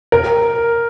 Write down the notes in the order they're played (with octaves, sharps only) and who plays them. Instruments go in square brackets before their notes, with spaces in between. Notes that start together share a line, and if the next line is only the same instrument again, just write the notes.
[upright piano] A#4